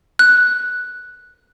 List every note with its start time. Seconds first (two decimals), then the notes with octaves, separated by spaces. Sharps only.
0.19 F#6